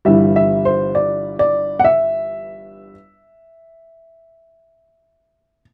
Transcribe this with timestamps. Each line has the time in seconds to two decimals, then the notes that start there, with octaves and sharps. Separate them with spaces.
0.05 G1 G2 E3 G3 E5
0.36 E5
0.65 C5
0.95 D5
1.39 D5
1.79 F#5
1.84 E5